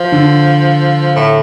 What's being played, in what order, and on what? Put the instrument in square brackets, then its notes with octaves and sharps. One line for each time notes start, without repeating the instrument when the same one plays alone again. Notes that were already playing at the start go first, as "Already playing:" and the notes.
Already playing: [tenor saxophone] F3
[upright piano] D3
[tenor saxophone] A2